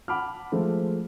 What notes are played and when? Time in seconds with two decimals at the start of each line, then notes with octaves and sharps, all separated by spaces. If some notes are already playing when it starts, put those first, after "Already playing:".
0.08 F#5 A5 B5 D6 F6
0.52 F3 G#3 A3 C5